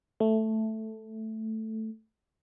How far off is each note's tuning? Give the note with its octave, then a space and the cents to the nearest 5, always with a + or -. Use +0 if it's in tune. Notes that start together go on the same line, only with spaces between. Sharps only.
A3 +0